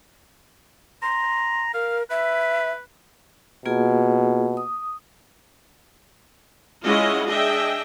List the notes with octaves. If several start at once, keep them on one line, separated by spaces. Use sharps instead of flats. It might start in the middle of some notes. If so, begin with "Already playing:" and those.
A#5 C6
A#4 F5
B4 E5
B2 A#3 F4 G#4
D#6
G#3 C#4 E4 F4 D#5 F#5
D4 G#4 D#5 E5 G5